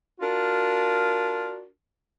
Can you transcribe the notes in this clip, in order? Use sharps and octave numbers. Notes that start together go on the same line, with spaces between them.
D4 F4 F#4 A#4